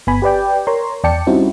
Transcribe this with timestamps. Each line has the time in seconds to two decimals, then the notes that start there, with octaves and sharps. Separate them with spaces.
0.07 G1 B3 G#5 B5
0.22 G4 B4 D5 G5
0.67 A#4 C#5 A#5 C6
1.04 E2 D5 G5 A5 C#7
1.27 G3 C4 C#4 D#4 E4 F#4